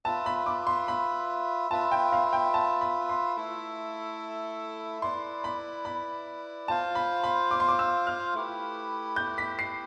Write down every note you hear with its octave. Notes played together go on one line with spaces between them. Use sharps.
F4 B4 E5 A5
B5
D6
C6
B5
F4 B4 E5 A5
G5
F5
G5
A5
B5
C6
A3 E4 A4 E5
E4 B4 D5 C6
B5
B5
F4 C5 F5 A5
B5
B5
D6
C6
D6
E6
F6
A3 E4 G4 B4
G6
B6
C7